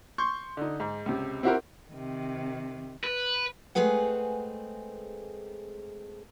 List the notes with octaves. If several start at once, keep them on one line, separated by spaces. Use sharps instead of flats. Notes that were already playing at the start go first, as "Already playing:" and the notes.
C6 C#6 G6
D3 D#4
G#2
C#2 C3
C4 E4 F#4 G4 A#4
C3 D#3
B4
G#3 A3 C4 G#4 B4 F#5